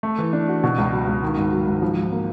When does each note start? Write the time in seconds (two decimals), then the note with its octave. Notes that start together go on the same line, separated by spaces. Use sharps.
0.03 A3
0.18 E3
0.33 D4
0.48 F#4
0.63 B2
0.78 C#2
0.92 F#3
1.08 C#2
1.23 D#3
1.37 G#2
1.52 F#3
1.67 G#2
1.82 F3
1.97 G#2
2.12 A#3